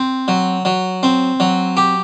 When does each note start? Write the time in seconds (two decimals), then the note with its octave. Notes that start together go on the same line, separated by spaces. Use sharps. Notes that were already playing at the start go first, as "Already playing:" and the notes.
Already playing: C4
0.28 F#3
0.65 F#3
1.03 C4
1.40 F#3
1.77 G4